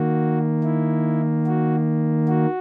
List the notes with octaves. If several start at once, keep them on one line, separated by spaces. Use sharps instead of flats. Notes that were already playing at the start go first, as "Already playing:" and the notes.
Already playing: D#3 A#3 F#4
E4
F#4
F#4